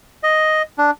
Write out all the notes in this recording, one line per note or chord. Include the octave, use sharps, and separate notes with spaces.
D#5
D4